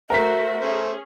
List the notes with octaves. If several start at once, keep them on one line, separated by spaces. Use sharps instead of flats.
A3 F#4 A#4 C5 E5 B6
A3 C#4 G#4 C5